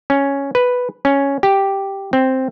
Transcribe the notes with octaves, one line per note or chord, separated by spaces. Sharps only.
C#4
B4
C#4
G4
C4